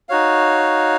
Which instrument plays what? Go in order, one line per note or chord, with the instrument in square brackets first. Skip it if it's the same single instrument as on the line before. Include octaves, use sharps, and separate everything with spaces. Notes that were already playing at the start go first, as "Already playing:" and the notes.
[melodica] D#4 F#4 C#5 F5